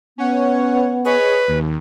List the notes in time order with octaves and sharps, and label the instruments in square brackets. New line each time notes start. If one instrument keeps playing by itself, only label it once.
[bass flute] B3 [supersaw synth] C#4 C#5 F#5
[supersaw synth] G#4 C#5 D#5 [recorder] B4
[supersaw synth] D#2